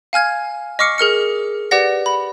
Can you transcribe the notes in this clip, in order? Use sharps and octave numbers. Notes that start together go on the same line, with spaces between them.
F5 G#5 F6 G#6
D#5 C#6 D6 F6 C7 C#7
G#4 A#4 F6 C#7
G4 B4 D5 F#5 A#6
B5